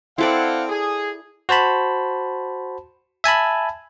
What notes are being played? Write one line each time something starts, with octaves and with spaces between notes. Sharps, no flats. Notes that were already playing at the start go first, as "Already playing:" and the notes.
C4 E4 A4 D5 F5 F#5
G#4
F#4 C5 A5 B5
E5 G#5 A5 B5